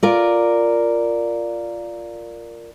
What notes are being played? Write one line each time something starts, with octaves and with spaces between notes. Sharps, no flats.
F4 A#4 D5